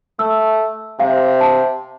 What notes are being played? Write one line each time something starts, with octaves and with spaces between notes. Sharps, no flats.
A3 E6
C3 F5
A5